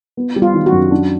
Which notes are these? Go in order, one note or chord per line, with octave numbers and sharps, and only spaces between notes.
B3
G3
F4
D#3
F#4
F#2
D4